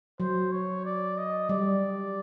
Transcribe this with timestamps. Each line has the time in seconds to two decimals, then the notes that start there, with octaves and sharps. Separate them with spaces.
0.20 F#3 C5
0.52 C#5
0.85 D5
1.18 D#5
1.49 G3 D5